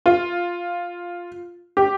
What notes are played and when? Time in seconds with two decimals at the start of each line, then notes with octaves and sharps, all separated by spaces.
0.06 F4
1.77 G4